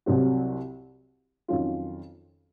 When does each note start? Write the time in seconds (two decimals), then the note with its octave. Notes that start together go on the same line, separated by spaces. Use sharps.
0.06 C2 C3 F#3 C4 F#4
1.48 F2 D#3 F#3 C#4 F4